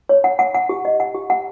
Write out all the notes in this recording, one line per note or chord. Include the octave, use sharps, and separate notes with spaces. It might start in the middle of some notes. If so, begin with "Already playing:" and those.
C#5
F#5
F#5
F#5
G4
D#5
F#5
G4
F#5